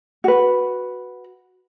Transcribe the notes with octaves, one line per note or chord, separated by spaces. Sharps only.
F#4 B4